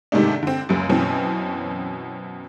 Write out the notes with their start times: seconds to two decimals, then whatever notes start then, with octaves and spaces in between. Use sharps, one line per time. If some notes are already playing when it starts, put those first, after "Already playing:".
0.12 G#2 C3 D#3 G#3 A3 D4
0.43 D3 C4
0.69 C#2 F#2
0.89 F#2 B2 E3 C4 C#4